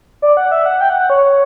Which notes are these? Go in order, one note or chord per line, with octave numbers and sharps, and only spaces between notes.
D5
F#5
E5
F#5
G5
F#5
F#5
C#5